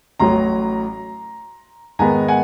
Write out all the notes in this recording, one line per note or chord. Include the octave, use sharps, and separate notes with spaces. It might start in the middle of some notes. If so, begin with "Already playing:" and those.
A1 A2 F#3 A#5 C6
G#2 D#3 G#3 B3 G#5 A#5
F#5 G#5